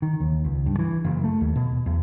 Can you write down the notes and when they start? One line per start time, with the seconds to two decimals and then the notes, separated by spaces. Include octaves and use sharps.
0.02 D#3
0.20 D#2
0.45 C#2
0.66 G2
0.79 E3
1.04 F#1
1.24 A3
1.41 D#2
1.56 B2
1.86 E2